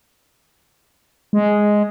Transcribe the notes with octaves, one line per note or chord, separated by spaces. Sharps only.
G#3